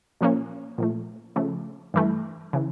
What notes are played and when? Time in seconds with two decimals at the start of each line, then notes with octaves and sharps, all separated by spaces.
0.21 A#2 F3 A#3 C#4
0.78 A#2 F3 A3
1.36 C#3 F3 A3
1.94 G2 E3 A3
2.53 C#3 E3